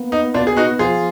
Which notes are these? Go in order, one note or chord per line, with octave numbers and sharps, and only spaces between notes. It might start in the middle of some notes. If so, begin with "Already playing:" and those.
Already playing: A#3 B3
B3 D#4
B2 D4 F4
G#4
B3 D#4 F#4
F3 F4 G#4